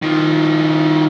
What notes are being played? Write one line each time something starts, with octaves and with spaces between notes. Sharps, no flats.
D#3 F3